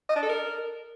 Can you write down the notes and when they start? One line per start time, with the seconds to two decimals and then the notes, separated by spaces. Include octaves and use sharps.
0.09 D#5
0.16 D4
0.22 A4
0.29 A#4